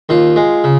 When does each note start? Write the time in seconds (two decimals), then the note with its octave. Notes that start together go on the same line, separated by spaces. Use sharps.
0.09 D#2 F4
0.36 G#3
0.64 C#3